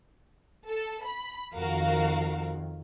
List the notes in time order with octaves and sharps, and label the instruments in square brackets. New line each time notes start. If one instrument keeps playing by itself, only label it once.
[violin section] A4
B5
[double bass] F2 D#3 [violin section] F#4 A#4 F5